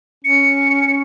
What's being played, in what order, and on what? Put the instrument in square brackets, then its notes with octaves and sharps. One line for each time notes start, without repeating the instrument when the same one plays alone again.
[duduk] C#4 [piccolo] C#7